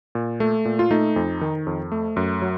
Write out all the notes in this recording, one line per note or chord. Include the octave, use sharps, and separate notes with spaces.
A#2
A3
A#2
F4
A3 D#4
F2
D#3
F2
A3
F#2
F#3